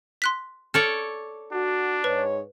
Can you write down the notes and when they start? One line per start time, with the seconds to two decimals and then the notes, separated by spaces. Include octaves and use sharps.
0.22 C6 F#6 B6
0.74 A4 C#5 D5 F6
1.52 D4 F#4
2.04 G#2 B4 C#5